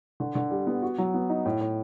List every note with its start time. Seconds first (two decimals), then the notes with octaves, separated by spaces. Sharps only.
0.20 D3
0.35 D3
0.51 G3
0.67 B3
0.82 F#4
0.98 F#3
1.14 B3
1.30 D#4
1.45 A2
1.61 A2